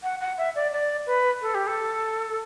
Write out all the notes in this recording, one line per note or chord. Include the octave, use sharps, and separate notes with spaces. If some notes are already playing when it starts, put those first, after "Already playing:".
F#5
F#5
E5
D5
D5
B4
A4
G4
A4